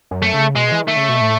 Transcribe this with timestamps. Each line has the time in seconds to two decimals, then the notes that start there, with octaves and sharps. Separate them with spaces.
0.11 F#2
0.22 A3
0.33 C#3
0.55 B2 G#3
0.72 E3
0.84 D#3 A3
0.97 C#3
1.09 B2
1.21 A2